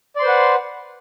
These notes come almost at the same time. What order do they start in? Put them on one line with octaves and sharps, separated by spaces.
D5 C6 C5 B4 F#5